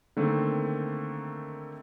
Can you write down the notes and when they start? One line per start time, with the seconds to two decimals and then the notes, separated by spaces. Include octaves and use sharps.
0.17 D3 D#3 A3 A#3 C4